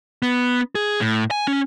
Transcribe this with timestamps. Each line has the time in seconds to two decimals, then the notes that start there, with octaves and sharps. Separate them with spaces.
0.22 B3
0.75 G#4
1.01 A2
1.31 G#5
1.48 C#4